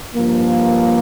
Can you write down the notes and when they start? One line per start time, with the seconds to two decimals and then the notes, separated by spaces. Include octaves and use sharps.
0.15 G2 F3 A#3